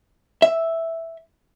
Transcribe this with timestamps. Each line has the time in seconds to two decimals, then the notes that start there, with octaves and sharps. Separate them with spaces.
0.42 E5